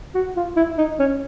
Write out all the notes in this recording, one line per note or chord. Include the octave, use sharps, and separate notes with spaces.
F#4
F4
E4
D#4
C#4